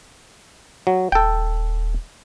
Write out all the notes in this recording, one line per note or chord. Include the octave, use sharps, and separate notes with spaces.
F#3
D#1 A4 G5